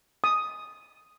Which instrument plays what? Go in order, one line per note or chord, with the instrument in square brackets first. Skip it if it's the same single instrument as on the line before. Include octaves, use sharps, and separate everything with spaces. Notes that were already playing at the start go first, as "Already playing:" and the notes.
[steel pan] D#6